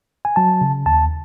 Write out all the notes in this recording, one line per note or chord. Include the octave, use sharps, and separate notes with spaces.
G#5
F#3 A5
C#3
D#2 A5